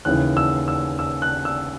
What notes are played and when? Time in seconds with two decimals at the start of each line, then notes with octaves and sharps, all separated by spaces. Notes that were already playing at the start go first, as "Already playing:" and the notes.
0.05 D#2 C#3 E3 F#6
0.37 E6
0.68 E6
0.99 E6
1.22 F#6
1.45 E6